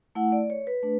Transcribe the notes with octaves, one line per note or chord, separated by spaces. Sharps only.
A3 E4 F#5
D5
C#5
B4
A3 D4